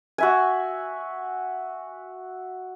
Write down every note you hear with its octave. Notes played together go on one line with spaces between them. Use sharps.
F#4 E5 G#5